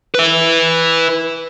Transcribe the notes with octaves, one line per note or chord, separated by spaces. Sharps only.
B4 E5